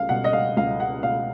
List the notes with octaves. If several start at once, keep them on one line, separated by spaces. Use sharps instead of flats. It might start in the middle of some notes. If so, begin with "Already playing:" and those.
Already playing: C#2 F5
B2 F#5
D#5
F5
C#2 F5
F#5
B2 F5